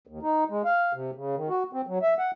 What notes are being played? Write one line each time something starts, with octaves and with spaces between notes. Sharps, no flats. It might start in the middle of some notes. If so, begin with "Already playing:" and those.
D#2
D#4
G#3
F5
C3
C#3
D#3
F#4
C4
F#3
E5
F#5